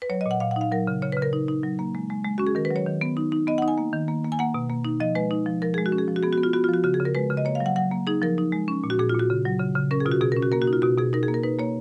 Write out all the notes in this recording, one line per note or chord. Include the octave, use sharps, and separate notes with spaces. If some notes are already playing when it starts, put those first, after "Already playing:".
B4
F#3 C#5
D#5
A#2
F#5
A#2 F5
F#5
D#4 F5
F#3 A#4
C#3
C#3 C#5
B4
C#3
A#4
D#4
D#4
F#3
A#3
G#3
G#3
G#3
C#4 F#4
G#4
D#3 A#4
B4
F#3 C#5
D#3
B3
D#4
D#4
B3 D#5
F#5
D#4
G#5
A#3
D#3
A#3
A#3
G#5
A#3 F#5
B2
A#3
D#4
F3 D#5
G#3 B4
D#4
F3
F3 A#4
G#3 G#4
F#4
C#4
G#4
F3
F#4
B3 G#4
F#4
B3
F4
B3 F#4
F4
F3
F#4
C#3 F#4
G#4
C#3
A#4
G#3 B4
C#3
D#5
A#3 C#5
F5
F#3
F#5
F#3 F#5
A#3
D#4 G#4
F3 A#4
D#4
G#3
C#4
A#2
F#4
A#2 G#4
F4
A#2
F#4
C#3
F#3
C#3
C#3
C#4 A#4
G#4
B2 F4
F#4
B2 G#4
A#4
C#4
F#4
A#3 A#4
F#4
D#4
F4
B2 F#4
B2 G#4
D#4 A#4
G#4
A#3
A#4
D#4 B4
A#3 C#5